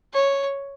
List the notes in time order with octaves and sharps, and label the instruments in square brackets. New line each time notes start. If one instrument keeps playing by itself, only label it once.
[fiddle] C#5